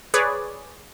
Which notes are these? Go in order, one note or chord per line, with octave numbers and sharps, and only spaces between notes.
G#4 B4 C#5 D5 G#5